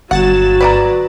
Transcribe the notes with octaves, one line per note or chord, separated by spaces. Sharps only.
G1 F#3 F#5 A6 E7
B4 D5 A#5